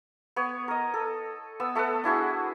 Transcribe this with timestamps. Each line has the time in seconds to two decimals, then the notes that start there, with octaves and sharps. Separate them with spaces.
0.36 B3 C#5
0.68 A#4 D#5
0.94 A4
1.60 B3 E6
1.75 A3 A4 B4 F#5
2.04 D4 E4 F#4 G#4